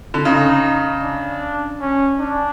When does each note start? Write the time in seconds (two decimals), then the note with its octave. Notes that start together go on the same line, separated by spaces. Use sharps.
0.14 D3
0.25 C#3 D#4
1.03 D4
1.81 C#4
2.20 D4